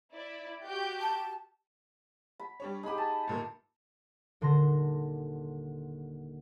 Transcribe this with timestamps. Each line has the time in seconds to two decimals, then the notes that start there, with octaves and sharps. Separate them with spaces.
0.13 E4 D5
0.62 F#4 G4 G6
1.01 A5
2.39 B5
2.60 G3 D4 C#5
2.83 D#4 G4 G#4 G#5 B5
2.98 A5
3.28 G1 A#2 A#3
4.41 D#1 D3 C6 A#6